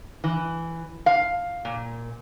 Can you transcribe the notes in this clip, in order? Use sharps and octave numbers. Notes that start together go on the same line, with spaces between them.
E3
F5
A#2